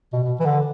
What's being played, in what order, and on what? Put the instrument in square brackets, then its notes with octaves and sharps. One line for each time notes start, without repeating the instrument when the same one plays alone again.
[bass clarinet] B2
B2
E3
D3